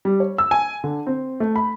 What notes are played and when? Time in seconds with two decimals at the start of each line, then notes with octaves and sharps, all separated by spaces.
0.05 G3
0.20 C#5
0.38 E6
0.51 G#5
0.84 D3
1.07 C4
1.40 A3
1.56 B5